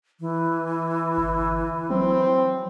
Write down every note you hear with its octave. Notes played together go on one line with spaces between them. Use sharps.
E3
G1
F#3 C4